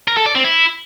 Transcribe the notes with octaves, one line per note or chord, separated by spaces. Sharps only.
A#4
A4
D5
C4
E4